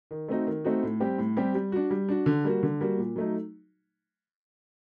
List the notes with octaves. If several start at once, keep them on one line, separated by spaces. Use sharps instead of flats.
D#3
A3 C4 D#4 F#4
D#3
A3 C4 D#4 F#4
A2
G3 C4 G4
A2
G3 C4 G4
G3
D4 F#4
G3
D4 F#4
D3
G3 A#3 F#4
D3
G3 A#3 F#4
A#2
F#3 A3 D#4